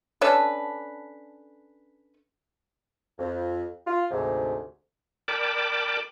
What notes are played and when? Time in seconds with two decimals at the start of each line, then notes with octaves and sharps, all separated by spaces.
0.21 C#4 D4 A4 B4
3.18 F2
3.86 F4
4.11 D2 G#2 C3
5.28 A#4 D5 G5 A5 B5 D6